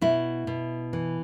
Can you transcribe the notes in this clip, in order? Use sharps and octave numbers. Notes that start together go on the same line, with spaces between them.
B2 E4
B2
E3